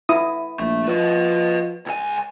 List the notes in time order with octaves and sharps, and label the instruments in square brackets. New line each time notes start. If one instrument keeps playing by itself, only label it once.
[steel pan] E4 D#6
[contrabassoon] A#1 [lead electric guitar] A3
[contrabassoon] F3 [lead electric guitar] B4 D#5
[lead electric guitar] C#2 G#5